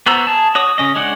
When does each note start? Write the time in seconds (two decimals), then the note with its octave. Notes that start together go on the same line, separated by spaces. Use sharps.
0.06 B3 F#4 C5 A#5 E6
0.27 G#4 A5
0.55 F#4 C#5 D#6
0.78 C#3 C#4 D#5
0.96 G#3 D4 C#5 F#5